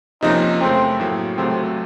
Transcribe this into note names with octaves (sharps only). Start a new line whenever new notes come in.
C3 F3 A#3 C#4 D#4
F#2 C#3 A3 C4
A2 F#3 A#3
C#2 C3 F#3 A3 C4